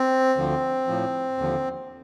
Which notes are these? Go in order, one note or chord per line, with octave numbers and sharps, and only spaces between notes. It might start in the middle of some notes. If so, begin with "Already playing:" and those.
Already playing: C4
D2 D3 F3
A2 F3
D#2 D3 F3